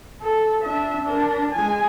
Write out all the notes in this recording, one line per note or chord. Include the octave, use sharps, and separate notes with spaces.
A4
D4 E5
D4 A#4
G#3 G#5